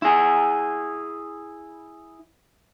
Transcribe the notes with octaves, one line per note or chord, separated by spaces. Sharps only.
E4 G#4